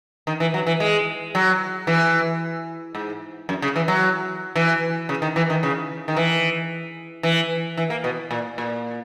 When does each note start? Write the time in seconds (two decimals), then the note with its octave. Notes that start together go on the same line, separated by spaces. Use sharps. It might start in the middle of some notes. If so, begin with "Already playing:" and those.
0.27 D#3
0.40 E3
0.54 F#3
0.67 E3
0.80 G#3
1.35 F#3
1.87 E3
2.95 G#2
3.49 F#2
3.62 C#3
3.76 E3
3.88 F#3
4.56 E3
5.09 C#3
5.22 D#3
5.36 E3
5.50 D#3
5.63 C#3
6.08 D#3
6.17 E3
7.23 E3
7.77 E3
7.90 A#3
8.04 B2
8.31 A#2
8.58 A#2